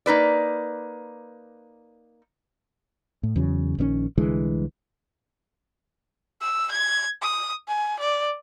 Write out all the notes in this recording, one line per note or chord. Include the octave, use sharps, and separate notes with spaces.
A#3 D#4 B4 D5
A2
E2 C#3 F#3
A#1 D#3 C4 C#4
C2 D3 E3 G#3
E6
G#6
D#6
G#5
D5